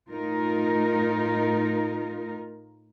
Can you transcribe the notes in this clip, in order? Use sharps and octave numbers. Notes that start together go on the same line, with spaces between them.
A2 D#4 F4 A#4